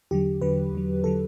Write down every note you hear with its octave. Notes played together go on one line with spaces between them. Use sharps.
E2 D3 F#3 G4
E2 D3 F#3 B4
E2 D3 F#3
D3 F#3 A4